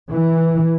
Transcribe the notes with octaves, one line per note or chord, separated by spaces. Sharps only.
E3